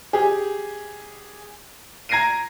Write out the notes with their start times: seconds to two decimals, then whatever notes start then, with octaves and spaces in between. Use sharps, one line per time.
0.13 G4 G#4
2.09 A#5 G#6 A#6 C7 D7 D#7